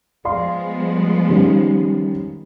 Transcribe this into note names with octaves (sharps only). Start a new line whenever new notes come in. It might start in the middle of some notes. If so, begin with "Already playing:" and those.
F3 G#3 B3 D5 F5 C6
D#3 G3 C#4